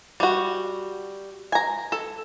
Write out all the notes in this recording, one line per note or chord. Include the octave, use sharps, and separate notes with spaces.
G3 F#4
G#5 A#5
A4